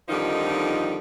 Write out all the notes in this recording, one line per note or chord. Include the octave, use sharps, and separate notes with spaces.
F2 D3 D#3 F3 G3 D#4